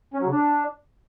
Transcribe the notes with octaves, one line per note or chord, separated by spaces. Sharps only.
C#4
F#3
C#3
D4